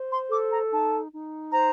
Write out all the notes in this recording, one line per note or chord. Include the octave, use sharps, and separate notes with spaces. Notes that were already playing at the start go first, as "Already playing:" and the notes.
Already playing: C5
C6
A4 D6
A#5
D#4 A5
D#4
C5 A#5